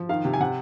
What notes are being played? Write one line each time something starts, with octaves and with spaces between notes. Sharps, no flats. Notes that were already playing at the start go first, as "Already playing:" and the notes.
Already playing: F3
D#3 F5
C3
G#5
C3 F#5